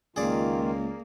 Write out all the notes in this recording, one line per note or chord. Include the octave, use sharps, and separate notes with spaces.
C#2 D#3 A#3 F4 G#4 D5